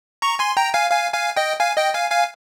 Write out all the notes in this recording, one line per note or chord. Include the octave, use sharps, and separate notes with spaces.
A#5 C#6
G#5 C6
G5 A#5
F5 G#5
F5 G#5
F5 G#5
D#5 G5
F5 G#5
D#5 G5
F5 G#5
F5 G#5